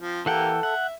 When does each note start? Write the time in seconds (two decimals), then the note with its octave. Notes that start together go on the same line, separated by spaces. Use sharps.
0.01 F3 C4
0.26 E3 A#3 G4 A4 A#4 F#5 G5
0.63 E5 F#5